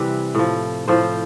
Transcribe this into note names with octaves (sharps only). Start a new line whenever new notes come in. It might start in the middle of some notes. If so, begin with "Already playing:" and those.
Already playing: C3 E3 G3 B4
A2 F3
A2 F3 C5